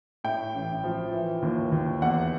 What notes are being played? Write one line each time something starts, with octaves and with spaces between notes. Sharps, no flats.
A2 G5
A1
F3
E3
D#2
D#2
E2 F#5